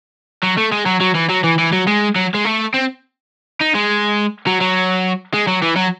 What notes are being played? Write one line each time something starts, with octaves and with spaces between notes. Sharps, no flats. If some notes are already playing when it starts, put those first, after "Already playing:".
F#3
A3
G#3
F#3
F#3
E3
F#3
E3
E3
F#3
G#3
F#3
G#3
A3
C4
D#4
G#3
F#3
F#3
G#3
F#3
E3
F#3